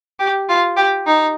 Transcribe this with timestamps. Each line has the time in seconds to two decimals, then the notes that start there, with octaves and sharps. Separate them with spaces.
0.20 G4
0.49 F4
0.77 G4
1.07 D#4